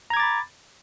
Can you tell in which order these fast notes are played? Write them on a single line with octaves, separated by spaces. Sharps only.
A#5 G#6 D6 A6 B5